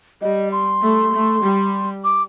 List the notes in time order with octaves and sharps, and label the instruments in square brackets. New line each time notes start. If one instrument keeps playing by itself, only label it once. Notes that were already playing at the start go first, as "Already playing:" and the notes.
[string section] G3 [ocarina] D#5
[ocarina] C6
[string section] A3
A3
G3
[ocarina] D6